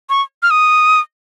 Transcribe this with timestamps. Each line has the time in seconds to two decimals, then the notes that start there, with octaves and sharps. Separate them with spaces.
0.10 C#6
0.43 F6
0.51 D#6